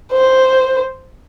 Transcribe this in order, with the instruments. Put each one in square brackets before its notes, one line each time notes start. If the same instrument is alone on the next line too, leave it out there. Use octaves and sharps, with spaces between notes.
[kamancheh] C5